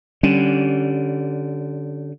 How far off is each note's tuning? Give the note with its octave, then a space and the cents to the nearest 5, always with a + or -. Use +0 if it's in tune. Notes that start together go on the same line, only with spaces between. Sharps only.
D3 +0 G3 -25 C#4 +0